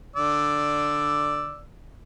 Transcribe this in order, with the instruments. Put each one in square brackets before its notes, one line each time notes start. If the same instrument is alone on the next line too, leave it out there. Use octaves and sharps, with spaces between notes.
[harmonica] D3 D5 E6